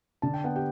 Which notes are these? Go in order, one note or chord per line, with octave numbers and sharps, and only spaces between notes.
D3 A5
G5
B3 F#5
G4 G5